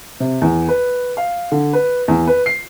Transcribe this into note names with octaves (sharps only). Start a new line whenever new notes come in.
C3
E2
B4
F5
D3
B4
E2
B4
C7